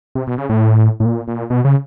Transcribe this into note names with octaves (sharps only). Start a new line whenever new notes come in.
C3
B2
C#3
A2
A2
A#2
A#2
B2
C#3